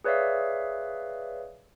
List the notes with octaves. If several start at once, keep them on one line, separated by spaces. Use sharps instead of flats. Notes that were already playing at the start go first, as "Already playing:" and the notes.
G#4 B4 C#5 D5 E5 F5